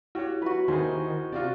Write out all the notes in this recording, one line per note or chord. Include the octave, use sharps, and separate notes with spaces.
E4 F#4 G4 C#5
F#3 F#4 B4
D#2 C3 D#3 G#4 C5
C3 F4 F#4 D5